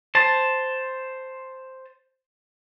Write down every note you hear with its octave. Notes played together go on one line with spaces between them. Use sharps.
C5 A5